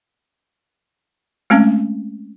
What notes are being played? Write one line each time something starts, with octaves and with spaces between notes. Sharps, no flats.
G#3 A3 C4 C#4